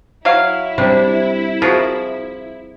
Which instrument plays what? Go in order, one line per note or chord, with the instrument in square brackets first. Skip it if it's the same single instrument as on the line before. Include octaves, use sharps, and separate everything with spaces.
[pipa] F#3 F5 [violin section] E4
[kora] C3 G3 D4
[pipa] F3 [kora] F#4 G#4 A#4